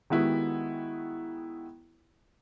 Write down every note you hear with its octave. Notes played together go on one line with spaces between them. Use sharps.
D#3 G#3 B3 E4 F#4 G4